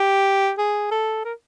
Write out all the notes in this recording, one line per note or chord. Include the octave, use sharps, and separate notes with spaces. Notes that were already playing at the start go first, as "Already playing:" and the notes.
Already playing: G4
G#4
A4
A#4